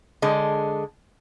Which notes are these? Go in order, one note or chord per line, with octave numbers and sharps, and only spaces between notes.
D3 G#3